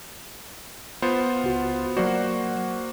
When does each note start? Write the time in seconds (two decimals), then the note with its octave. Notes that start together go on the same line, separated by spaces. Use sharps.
1.02 B3 F4 C5
1.44 C#2 F#4
1.97 F#3 A#3 F#4 C5 D5